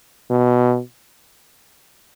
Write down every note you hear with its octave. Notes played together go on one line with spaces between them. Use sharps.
B2